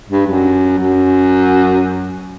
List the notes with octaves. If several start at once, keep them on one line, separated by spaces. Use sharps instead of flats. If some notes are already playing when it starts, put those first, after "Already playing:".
G2
F#2
F#2